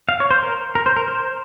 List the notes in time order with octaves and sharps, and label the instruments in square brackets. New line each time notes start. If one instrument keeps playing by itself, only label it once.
[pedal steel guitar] F5
C#5
C5
A#4
A#4
C5
A#4
C5